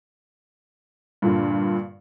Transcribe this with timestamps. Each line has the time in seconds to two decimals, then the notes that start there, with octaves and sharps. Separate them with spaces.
1.22 G2 A#2 D3